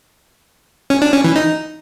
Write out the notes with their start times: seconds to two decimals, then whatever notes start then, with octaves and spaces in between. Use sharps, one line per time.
0.90 C#4
1.02 D4
1.13 C#4
1.24 E3
1.36 D#4